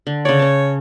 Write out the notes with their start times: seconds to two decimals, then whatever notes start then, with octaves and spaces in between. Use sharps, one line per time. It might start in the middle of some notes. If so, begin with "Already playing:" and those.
0.07 D3
0.25 C#3 C#5 D5
0.39 C#4 A5